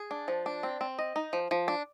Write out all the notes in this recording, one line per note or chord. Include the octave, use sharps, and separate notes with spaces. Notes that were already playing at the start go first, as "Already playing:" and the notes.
Already playing: G#4
D4
F3
D4
C4
C4
D#5
D#4
F3
F3
D4